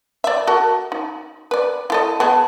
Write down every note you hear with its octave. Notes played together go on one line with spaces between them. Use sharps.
D5 E5
F#4 A4 A#4
D#4
B4 D5
E4 A4 D#5
B3 G#4 A5